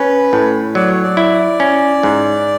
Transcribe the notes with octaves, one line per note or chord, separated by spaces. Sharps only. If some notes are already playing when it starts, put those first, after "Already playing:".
Already playing: C#4 B4
A2
F#3 D5
C#5
D5
E4
C#4
G#2